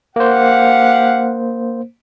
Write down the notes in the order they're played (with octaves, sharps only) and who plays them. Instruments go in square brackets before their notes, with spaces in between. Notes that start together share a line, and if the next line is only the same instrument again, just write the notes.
[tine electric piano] A#3 C5 [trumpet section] G4 F5 F#5